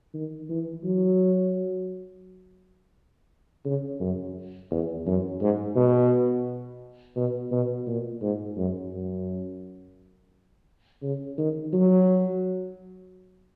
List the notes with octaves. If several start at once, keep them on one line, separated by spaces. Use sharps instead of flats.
D#3
E3
F#3
C#3
F#2
E2
F#2
G#2
B2
B2
B2
A#2
G#2
F#2
F#2
C#3
D#3
F#3